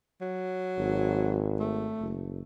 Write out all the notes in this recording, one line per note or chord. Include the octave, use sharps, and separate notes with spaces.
F#3
G#1
A3
F#1